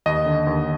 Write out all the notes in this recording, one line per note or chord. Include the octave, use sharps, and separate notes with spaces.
D#2 D#5
D3
D#2